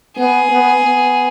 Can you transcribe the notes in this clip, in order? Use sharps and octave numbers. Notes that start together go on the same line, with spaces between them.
B3 G#4
B3
B3